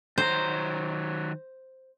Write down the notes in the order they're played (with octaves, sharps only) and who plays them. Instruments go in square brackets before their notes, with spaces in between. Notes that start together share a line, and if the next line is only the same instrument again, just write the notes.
[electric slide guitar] D#3 F#3 A#5 [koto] C5